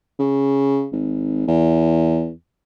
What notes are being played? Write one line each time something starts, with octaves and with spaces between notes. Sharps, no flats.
C#3
G#1
E2